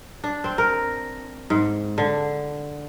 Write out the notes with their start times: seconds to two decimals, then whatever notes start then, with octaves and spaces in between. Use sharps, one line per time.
0.24 D4
0.44 C4
0.58 A#4
1.50 G#2
1.98 D3